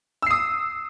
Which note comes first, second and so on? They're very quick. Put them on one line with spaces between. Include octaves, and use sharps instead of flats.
E6 C7 D#6